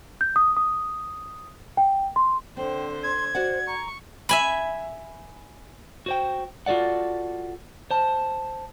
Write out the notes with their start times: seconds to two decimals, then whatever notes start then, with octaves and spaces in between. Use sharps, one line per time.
0.21 G6
0.36 D#6
0.57 D#6
1.77 G5
2.16 C6
2.57 D3 C4 C5 G5
3.03 C6 G#6
3.35 F#4 C5 D5 F#5
3.67 A#5 C#6
4.29 E5 G#5 B5
6.06 F#4 C5 G5
6.66 F4 F#4 A4 D5 F#5
7.91 C5 A5